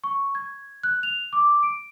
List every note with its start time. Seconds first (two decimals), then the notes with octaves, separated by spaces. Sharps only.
0.04 C#6
0.35 G#6
0.83 F#6
1.03 F7
1.33 D6
1.63 D7